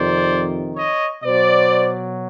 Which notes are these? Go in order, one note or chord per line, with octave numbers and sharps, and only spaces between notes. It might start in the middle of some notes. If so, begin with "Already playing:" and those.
Already playing: F2 C3 D#3 C5 D5
C#5 D#5
B2 F#3 C5 D5